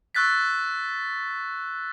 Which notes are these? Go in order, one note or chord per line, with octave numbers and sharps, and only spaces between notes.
C#6 E6 F#6 A6 B6